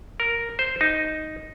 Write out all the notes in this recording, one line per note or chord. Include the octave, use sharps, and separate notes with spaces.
A#4
C5
D#4